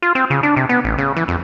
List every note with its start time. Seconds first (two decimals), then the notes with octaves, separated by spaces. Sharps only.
0.02 F4
0.15 C4
0.30 C#3
0.43 D4
0.56 C3
0.69 B3
0.84 A1
0.98 C#3
1.16 E3
1.28 F2